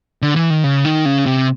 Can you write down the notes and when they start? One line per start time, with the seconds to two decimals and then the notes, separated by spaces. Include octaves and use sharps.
0.22 D3
0.36 E3
0.50 D#3
0.64 C#3
0.85 D#3
1.05 C#3
1.26 C3